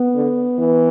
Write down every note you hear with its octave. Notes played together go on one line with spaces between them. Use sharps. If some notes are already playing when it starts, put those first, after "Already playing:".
Already playing: B3
D3
E3